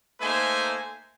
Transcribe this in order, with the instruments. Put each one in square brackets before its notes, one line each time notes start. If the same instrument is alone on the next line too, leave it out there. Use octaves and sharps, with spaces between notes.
[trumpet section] A3 A#3 D#4 C5 G#5